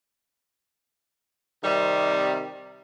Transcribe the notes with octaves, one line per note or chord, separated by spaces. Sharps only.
C3 D#3 G3